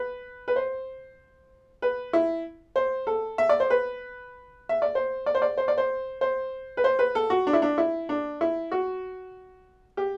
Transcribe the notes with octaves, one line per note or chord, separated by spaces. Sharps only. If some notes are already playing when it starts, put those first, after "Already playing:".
Already playing: B4
B4
C5
B4
E4
C5
A4
E5
D5
C5
B4
E5
D5
C5
D5
C5
D5
C5
D5
C5
C5
B4
C5
B4
A4
F#4
D4
E4
D4
E4
D4
E4
F#4
G4